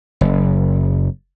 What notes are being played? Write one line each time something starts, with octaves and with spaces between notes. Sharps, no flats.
F#1